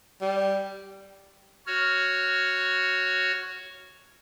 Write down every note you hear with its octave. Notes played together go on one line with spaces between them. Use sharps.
G3
F#4 C#5 F6